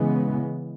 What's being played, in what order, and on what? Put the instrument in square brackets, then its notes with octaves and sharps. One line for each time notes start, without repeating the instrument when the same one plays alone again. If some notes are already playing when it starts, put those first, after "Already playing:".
Already playing: [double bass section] C#3 E3 G#3 B3